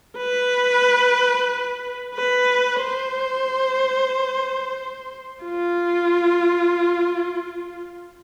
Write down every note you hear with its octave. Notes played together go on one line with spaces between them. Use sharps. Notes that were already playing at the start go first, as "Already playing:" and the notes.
B4
B4
C5
F4